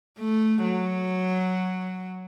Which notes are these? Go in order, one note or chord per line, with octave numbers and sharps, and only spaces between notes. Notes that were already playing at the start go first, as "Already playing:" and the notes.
A3
F#3